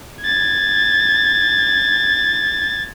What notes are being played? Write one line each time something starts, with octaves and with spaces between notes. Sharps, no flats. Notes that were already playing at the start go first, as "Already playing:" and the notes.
G#6 A6